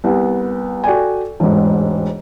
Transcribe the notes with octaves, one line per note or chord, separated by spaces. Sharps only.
C2 B3
F#4 A4 D5 G5 G#5
E1 A1 G#2